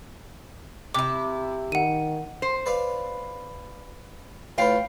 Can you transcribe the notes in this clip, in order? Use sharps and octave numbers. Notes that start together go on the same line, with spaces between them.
C3 E4 D6
D#3 F#5 D#7
C5
B4 D5 F5
A2 F4 B4 F5 G5